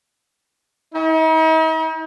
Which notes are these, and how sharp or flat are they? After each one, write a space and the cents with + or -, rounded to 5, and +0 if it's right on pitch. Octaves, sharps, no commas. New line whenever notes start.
D#4 +45